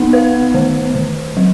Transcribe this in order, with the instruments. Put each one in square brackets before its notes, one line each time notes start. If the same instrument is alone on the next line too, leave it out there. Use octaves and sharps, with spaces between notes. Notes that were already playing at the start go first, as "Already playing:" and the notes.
Already playing: [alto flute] B3 [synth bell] D#4
[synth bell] B4
D#3
D#3
F#3